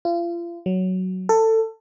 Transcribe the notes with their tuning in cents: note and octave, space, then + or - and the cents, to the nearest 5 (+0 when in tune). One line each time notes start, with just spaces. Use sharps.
F4 -35
F#3 +5
A4 +20